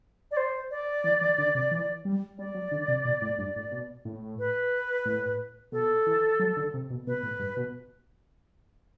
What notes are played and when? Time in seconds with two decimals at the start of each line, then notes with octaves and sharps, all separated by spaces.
0.31 D5
0.37 C5
0.71 D5
1.04 E3
1.21 E3
1.38 D3
1.55 C3
1.71 E3
2.05 G3
2.39 G3 D5
2.55 F#3
2.72 D3
2.88 C3
3.05 B2
3.22 A2
3.39 G2
3.56 A2
3.72 B2
4.05 A2
4.39 B4
5.05 A2
5.72 B2 A4
6.07 E3
6.39 F#3
6.57 D3
6.74 C3
6.90 B2
7.07 B2 B4
7.23 A2
7.40 G2
7.57 B2